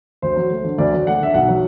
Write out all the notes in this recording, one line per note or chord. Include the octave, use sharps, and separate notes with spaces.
D2 C5
F#3
A3
D3
D2 D5
F#3
A3 F#5
D3 E5
B1 F#5
F#3